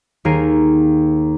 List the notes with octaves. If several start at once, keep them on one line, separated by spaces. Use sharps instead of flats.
D#2 G#4 A#4 C7 D7 D#7